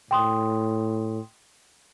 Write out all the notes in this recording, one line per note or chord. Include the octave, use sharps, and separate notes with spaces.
A2 G5 C6 D#6